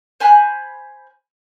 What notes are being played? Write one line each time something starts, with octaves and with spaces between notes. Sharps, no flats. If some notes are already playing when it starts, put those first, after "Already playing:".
C5 G#5 B5 F#6